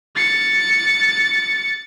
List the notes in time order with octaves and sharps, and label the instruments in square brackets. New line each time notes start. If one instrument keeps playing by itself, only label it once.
[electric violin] A6 C#7